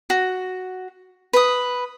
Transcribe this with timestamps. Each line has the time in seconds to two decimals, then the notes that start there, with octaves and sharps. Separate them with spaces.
0.10 F#4
1.33 B4 D#6